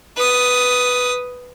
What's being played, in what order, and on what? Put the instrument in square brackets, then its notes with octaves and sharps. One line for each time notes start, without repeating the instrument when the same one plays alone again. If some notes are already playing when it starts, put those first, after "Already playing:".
[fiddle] B4 D#6